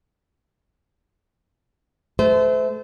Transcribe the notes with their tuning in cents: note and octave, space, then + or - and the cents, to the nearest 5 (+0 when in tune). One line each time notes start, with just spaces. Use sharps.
A3 -25 C5 -30